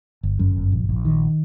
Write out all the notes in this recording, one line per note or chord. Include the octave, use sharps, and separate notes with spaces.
G1
F#2
G1
A#1
A#1
D#3